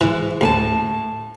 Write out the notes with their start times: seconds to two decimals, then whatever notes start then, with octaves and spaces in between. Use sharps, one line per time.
0.01 G#2 E3
0.41 D2 A2 G#5 A5